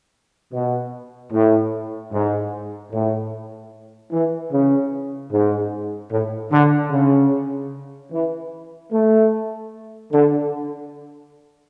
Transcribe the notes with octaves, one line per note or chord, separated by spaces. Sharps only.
B2
A2
G#2
A2
E3
C#3
G#2
A2
D3
C#3
E3
A3
D3